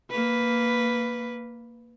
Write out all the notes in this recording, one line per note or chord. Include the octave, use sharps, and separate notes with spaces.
A#3 B4